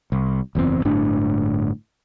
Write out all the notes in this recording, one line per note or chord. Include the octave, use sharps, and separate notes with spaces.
C2
F#1 E2 G2 C4
G1 A2 D4